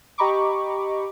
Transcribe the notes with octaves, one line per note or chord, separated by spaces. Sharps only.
G4 D#5 A#5 B5 C#6 D6